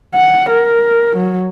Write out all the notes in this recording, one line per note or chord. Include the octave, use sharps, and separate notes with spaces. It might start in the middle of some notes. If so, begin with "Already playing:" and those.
F#5
A#4
F#3